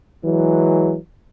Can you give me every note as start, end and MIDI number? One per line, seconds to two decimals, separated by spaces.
0.25 0.96 52
0.25 0.96 54
0.25 0.96 56